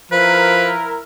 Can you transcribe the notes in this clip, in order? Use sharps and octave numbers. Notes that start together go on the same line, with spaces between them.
F3 E4 A#4 B4